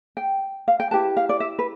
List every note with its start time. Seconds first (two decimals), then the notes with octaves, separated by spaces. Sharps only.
0.17 G5
0.68 F5
0.80 G5
0.91 E4 G4 B4 A5
1.17 F5
1.29 D5
1.40 E5
1.59 B4